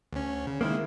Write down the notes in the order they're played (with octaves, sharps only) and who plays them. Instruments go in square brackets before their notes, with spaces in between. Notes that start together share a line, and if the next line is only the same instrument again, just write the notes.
[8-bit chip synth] D2 C#4
C#3
[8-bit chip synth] D#3 G#3 [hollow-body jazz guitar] A#3 C4 E4